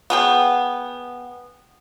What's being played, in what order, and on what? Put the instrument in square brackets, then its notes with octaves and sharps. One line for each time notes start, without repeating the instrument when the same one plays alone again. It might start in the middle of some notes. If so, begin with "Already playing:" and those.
[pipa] B3 G#4 G5